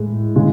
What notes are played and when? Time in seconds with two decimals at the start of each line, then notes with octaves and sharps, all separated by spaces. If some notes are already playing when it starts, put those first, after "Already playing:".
Already playing: A2 G#3
0.36 C#3 G#3